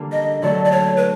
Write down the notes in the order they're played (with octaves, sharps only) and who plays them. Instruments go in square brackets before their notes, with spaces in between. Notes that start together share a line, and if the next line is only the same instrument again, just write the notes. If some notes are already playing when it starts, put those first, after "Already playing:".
Already playing: [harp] D3 G3 A#3
[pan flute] D#5
[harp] D3 F#3 A3 [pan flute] D5
[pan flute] D5
C#5
B4